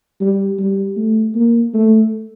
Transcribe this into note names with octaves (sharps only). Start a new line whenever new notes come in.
G3
G3
A3
A#3
A3